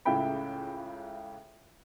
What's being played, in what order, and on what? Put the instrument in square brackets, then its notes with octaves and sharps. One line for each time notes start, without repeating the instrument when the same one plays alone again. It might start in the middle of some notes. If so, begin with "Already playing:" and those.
[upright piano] C#2 A2 C#3 E5 G5 B5